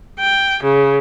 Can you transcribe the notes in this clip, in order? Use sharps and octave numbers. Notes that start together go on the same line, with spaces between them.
G5
C#3